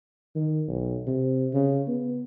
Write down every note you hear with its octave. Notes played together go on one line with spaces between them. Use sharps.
D#3
B1
C3
C#3
B3